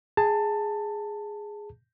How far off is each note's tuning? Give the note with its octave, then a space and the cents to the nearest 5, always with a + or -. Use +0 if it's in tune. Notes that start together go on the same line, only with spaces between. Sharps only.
G#4 +0 A5 +20